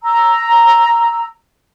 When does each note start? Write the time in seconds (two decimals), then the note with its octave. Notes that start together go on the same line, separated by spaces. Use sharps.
0.03 A#5 E6